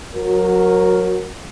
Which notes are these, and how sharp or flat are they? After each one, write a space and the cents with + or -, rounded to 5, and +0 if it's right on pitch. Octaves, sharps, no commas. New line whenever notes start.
F#3 -20 F#4 +0 A#4 +0